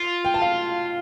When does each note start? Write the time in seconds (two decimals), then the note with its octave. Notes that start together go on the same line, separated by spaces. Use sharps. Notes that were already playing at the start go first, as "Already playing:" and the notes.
Already playing: F4
0.25 G5
0.34 A5
0.42 F5